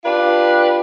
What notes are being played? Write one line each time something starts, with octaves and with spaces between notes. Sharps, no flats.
D4 F4 G4 B4 D5